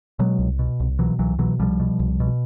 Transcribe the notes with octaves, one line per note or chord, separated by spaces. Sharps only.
B2 F#3 G#3
C2
B2
C2
B2 E3 F#3
C2 E3 F#3
B2 E3 F#3
C2 F3 G3
B2
C2
B2